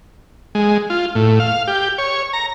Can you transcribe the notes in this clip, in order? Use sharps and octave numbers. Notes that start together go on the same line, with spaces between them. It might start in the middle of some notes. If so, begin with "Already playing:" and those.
G#3
F4
A2
F5
G4
C#5
A#5